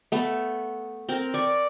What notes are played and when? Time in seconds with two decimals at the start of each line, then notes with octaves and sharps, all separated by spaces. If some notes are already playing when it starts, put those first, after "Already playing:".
0.12 A3 B3
1.09 C4 A#4
1.34 D5 C#6